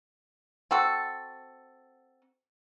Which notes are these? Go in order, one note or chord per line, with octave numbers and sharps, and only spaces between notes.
C4 F#4 A4